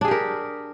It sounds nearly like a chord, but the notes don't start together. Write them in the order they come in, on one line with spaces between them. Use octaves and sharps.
D4 G#4 G4 A#4